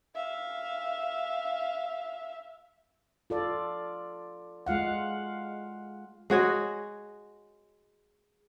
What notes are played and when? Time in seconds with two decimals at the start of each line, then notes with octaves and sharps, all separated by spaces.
0.15 E5 F5
3.30 F4 A4 D5
4.66 G#3 F4 F5 F#5
6.30 G#3 F#4 C#5 D#5